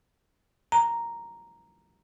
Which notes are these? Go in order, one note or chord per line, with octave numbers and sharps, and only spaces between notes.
A#5